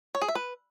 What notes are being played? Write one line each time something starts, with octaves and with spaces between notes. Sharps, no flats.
C#5
G#4
E5
B4